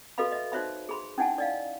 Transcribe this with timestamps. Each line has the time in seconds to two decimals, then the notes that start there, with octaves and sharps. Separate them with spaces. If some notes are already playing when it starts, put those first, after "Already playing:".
0.18 F#4 A4 B4 D#5 F5 B5
0.32 D#5 E5
0.52 D#4 F#4 C5 C#5 E5 B5
0.89 G#4 B5 C6
1.18 C#4 D#4 E4 F#5 G#5 A5
1.38 D5 D#5 F5